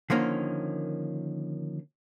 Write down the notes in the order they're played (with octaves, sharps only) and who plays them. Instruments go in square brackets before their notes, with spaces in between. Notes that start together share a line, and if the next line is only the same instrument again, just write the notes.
[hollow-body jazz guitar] D3 D#3 F3 A#3 C#4